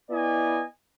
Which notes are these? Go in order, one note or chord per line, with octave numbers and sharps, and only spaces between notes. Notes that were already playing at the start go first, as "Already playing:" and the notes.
B3 E4 D5 D#5 G#5